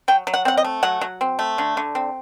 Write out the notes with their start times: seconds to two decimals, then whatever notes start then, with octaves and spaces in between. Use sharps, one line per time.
0.08 F#3 G5
0.27 F#3
0.34 F#5
0.45 C4 F#5
0.57 D#5
0.64 A3
0.83 F#3 F#5
1.01 F#3
1.21 C4
1.39 A3
1.58 D3
1.77 D3
1.95 C4